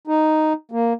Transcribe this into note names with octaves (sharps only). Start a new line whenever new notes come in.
D#4
A#3